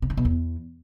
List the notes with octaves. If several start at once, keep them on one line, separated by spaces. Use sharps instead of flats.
C3
D3
B2
E2